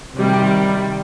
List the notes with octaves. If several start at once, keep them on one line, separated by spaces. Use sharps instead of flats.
C3 D#3 G3